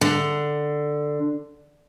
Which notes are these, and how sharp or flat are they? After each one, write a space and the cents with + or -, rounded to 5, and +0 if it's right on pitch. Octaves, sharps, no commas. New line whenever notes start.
D3 +10